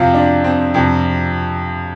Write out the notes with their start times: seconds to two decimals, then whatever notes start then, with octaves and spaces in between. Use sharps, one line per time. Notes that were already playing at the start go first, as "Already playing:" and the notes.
Already playing: F2 C3 F3 F4
0.14 D4
0.44 C4
0.74 F2 C3 F3